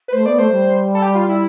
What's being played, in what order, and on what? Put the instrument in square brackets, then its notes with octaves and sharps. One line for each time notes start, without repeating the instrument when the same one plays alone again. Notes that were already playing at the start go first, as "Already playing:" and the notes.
[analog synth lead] B4
[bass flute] A3 [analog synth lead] C5
[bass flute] B3 [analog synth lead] D5
[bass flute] A3 [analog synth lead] C5
[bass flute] G3
[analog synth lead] A4
G4
F4
E4